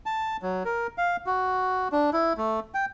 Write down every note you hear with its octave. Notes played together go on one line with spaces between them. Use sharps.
A5
F#3
A#4
F5
F#4
D4
E4
A3
G5